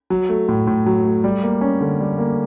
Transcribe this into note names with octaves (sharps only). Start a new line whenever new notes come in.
F#3
A3
A2
A2
F#3
A3
G3
A#3
C#4
D3
G3
A#3